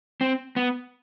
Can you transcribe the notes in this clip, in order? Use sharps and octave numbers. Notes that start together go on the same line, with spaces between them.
C4
B3